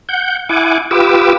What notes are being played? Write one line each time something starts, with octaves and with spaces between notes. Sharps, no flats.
F#5 G6
E4 F#5 G#5 D6
F4 G4 B4 D6 E6